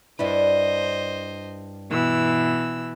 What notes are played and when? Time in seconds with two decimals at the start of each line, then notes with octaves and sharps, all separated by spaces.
0.19 G2 D4 E4 C5 D#5
1.91 B2 E3 E6